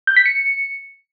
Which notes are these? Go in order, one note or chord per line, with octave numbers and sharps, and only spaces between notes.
G6
B6
C#7